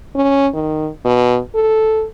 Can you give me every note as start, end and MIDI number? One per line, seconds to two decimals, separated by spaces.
0.15 0.48 61
0.54 0.89 51
1.05 1.38 47
1.55 2.05 69